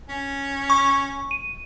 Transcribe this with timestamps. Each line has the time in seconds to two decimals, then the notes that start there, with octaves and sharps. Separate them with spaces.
0.09 C#4
0.70 C#6
1.31 D#7